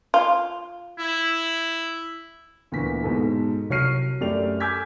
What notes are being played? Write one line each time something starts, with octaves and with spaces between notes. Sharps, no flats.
F4
E4
D2 A#2 E3 B3 B6
G#2 B2 G#3 A4
C2 F#3 C#5 F6 C7 D#7
F#2 A3 G4 D5 F7
G#5 D6 E6 G6 G#6 B6